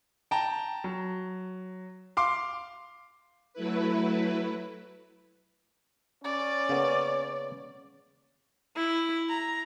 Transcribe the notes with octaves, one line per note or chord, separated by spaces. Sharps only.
G5 A5 A#5
F#3
F5 C6 D6
F#3 A3 E4 B4
C#4 C#5 D5
C#3 A#3 B3
E4
A#5